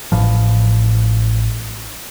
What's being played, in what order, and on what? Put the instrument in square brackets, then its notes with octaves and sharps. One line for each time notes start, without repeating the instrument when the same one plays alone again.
[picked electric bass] A1 A2 F3